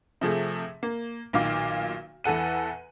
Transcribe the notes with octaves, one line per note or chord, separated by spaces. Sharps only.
C3 F3 A3 G#4
A#3
B1 A#2 D#3 F5 D6
E2 E3 A4 F#5 D#7